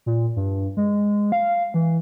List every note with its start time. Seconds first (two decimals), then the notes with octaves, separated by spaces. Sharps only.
0.06 A#2
0.36 G2
0.77 G#3
1.32 F5
1.74 E3